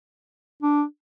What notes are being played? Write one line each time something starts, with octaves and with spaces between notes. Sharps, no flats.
D4